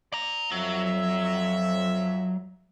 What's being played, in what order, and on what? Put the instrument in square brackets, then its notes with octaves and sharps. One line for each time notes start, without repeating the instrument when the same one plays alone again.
[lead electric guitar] D5 A#5
[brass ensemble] F2 F3 E5 [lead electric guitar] F#3